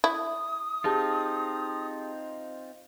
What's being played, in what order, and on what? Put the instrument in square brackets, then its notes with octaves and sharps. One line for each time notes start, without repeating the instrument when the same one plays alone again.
[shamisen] E4 [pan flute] D#6
[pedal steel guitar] C4 D#4 F4 [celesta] G4 G#4 A5